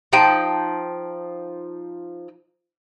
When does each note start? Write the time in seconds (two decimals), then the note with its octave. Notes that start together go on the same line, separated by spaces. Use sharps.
0.13 F3 D#4 G5 A5